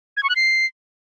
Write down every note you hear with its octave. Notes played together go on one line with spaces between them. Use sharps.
G#6
C#6
F#6
C7